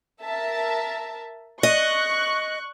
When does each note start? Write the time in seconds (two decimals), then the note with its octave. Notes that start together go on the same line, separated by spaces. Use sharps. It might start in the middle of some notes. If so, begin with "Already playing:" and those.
0.24 A#4 E5 A5
1.63 D#5 C#6 F#6